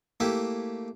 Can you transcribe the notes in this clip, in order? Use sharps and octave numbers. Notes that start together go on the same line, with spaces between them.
A3 A#3 E4 G4